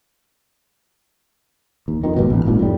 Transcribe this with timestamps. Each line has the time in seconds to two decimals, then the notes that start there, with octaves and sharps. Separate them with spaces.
1.88 D#2
2.04 F2 D#3
2.16 G#1 D#2 B2
2.30 A1
2.45 D#1 G#1 D#2 A#2
2.59 F2 A2 G3